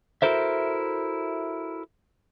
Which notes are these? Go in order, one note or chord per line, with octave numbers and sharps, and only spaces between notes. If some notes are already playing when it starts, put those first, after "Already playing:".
E4 F#4 A4 A#4 C5 E5